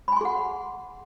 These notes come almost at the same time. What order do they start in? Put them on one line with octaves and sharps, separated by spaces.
B5 G#5 C6 G#4 F#5